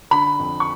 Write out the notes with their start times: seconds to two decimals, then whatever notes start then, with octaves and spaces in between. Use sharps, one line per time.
0.11 D3 B5
0.39 F2
0.60 C#6